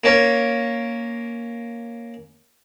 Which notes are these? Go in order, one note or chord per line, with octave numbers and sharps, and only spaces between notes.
A#3 C#4